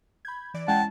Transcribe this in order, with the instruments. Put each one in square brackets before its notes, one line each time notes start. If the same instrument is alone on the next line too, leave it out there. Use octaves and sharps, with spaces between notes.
[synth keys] B5 G6 G#6
E3 D5 D7
[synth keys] G#3 C#4 E4 [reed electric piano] F#5 G5 [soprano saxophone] A5